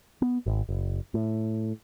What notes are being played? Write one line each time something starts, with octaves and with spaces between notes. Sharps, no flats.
B3
G#1
F#1
A2